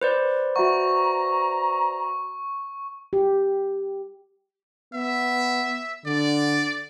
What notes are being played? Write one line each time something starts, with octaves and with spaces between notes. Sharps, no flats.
B4 C5 D5
F#4 E5 F#5 A#5 C#6
G4
B3 E5
D3 D5